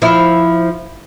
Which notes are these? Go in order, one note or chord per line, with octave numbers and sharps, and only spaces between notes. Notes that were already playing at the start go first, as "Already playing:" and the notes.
F3 E4